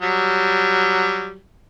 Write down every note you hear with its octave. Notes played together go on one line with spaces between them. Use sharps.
F#3 G3